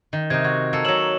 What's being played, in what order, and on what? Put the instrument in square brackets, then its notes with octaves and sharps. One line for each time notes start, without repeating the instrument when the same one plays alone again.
[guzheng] D#3
[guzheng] C3 D#4 [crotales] G#6
[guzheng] F#4 [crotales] G#6
[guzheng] A#3 A4
[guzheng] F#3 C#5 [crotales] E6 E7 F#7